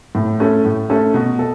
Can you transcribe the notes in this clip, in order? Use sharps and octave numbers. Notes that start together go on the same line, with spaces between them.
A2
A3 C#4 A4
A2
A3 C#4 A4
B2
A4